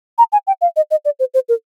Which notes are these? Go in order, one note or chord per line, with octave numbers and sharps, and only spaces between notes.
A#5
G#5
G5
F5
D#5
D#5
D5
C5
C5
A#4